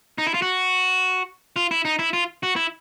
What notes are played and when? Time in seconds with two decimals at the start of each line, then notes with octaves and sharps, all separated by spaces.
0.18 D#4
0.27 E4
0.34 F4
0.42 F#4
1.56 F4
1.71 E4
1.85 D#4
1.99 E4
2.13 F4
2.43 F#4
2.56 E4